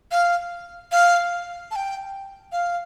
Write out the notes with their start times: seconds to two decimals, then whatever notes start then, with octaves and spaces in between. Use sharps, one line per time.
0.11 F5
0.92 F5
1.71 A5
1.76 G5
2.52 F5